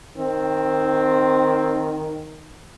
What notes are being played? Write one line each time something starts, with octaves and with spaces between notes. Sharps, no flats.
D#3 C4